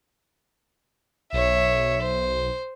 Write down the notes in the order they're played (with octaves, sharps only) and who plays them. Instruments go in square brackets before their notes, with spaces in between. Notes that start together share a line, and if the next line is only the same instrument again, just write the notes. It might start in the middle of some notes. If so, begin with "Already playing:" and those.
[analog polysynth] B1 [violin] C#5 E5
[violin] C5